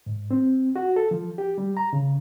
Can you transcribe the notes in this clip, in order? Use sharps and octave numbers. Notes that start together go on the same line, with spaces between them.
G#2
C4
F#4
A4
F3
G4
G3
A#5
C#3